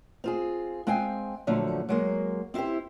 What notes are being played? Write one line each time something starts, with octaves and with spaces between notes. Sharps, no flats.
C4 F4 G#4
G#3 C4 F5 G5 G#5
A#2 D3 F3 F#3 A3
F#3 G#3 A#3
C4 E4 F#4 G4 C5